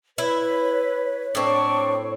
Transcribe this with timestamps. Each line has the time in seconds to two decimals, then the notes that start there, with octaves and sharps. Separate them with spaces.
0.18 E4 B4 C#5
1.35 A2 C4 D4 G5 C#6